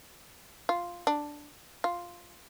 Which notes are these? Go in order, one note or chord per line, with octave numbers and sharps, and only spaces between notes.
F4
D4
F4